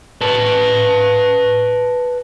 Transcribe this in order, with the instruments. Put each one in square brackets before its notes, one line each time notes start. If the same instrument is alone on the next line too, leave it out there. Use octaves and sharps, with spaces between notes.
[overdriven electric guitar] B4 A5